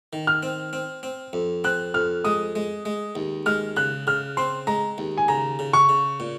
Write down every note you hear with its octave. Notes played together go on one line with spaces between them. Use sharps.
D#3
F6
C4
C4
C4
F2
C4 F#6
F2 F6
G#3 D#6
G#3
G#3
D#2
G#3 F6
C#3 F#6
C#3 F6
C4 C6
G#3 A#5
D#2
G#5
C#3 A#5
C#3
C#6
C#3
A#2